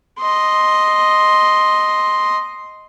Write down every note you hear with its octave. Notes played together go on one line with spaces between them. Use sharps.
D#5 C6